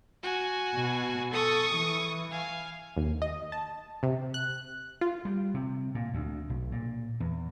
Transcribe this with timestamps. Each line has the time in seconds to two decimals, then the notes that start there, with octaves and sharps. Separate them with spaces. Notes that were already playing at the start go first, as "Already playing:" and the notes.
0.23 F#4 G#5
0.74 B2
1.33 A4 C#6 D#6
1.76 E3
2.31 F5 G#5
2.97 D#2
3.22 D#5
3.52 A5
4.03 C3
4.34 F#6
5.01 F4
5.25 G3
5.54 C3
5.95 A#2
6.14 D2
6.49 B1
6.72 A#2
7.20 E2